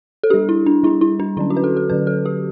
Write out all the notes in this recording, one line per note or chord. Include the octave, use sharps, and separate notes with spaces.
A4
G3 D4 G4
E4
D4
G3 D4 E4
E4
D4
D3 F#3 C#4 E4
F#4
B4
A4
A4
D3 F#3 C#4 B4
A4
G4